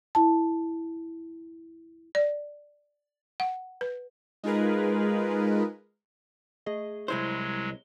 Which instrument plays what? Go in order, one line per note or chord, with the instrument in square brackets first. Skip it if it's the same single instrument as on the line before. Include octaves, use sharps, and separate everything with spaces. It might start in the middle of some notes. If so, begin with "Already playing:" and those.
[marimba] E4 A5
[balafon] D5
F#5
B4
[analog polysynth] G#3 D#4 F4 G#4 A#4 B4
[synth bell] A3 G#4 D#5
[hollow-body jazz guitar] C2 E4 C5 [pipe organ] F#3 G#3 [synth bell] G7